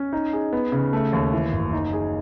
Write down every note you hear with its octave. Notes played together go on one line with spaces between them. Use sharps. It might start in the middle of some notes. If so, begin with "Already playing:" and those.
Already playing: C#4
D#4
G#4
B3
C#3
A3
D#2
E3
F#1
D#4
G#4